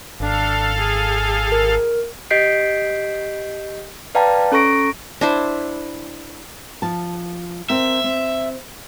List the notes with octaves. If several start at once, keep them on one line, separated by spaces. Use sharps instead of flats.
G#1 D4 A4 F5
G#4
A#4
G4 D#5 G6 B6 C7 D7
B4 D5 F5 G5 A5 A#5
C#4 A4 A#5 C#6 A#6 D7
D4 E4 C5
F3 A5
C4 A#4 E5
C4